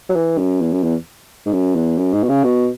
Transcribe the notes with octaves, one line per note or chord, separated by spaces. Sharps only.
F#3
E3
F#2
E2
F#2
E2
G#2
F#2
E2
F#2
G#2
B2
C#3
B2